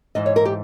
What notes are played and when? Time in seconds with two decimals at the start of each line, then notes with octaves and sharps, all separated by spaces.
0.15 G#2 E3 D#5
0.26 C#5
0.36 A#4
0.45 G4